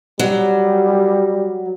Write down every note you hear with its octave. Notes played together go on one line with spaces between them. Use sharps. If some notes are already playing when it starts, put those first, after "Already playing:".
F#3 G3